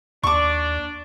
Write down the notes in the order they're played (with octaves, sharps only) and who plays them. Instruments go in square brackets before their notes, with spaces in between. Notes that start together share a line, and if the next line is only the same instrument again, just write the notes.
[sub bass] D#2 [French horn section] D4 D5 [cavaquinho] C#6 D6